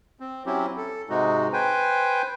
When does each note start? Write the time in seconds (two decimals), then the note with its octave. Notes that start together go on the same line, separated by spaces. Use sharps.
0.20 C4
0.46 F#3 C4 C#4 E4 G4
0.77 A4
1.09 G#2 C3 G#3 D#4 F#4
1.53 B4 C5 G5 G#5